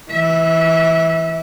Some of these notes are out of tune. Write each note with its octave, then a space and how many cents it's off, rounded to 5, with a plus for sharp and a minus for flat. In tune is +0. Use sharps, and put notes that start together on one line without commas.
E3 +0 E5 -30